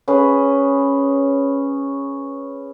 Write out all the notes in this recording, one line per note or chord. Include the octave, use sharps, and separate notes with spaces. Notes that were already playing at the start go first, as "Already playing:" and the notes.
C#4 G#4 B4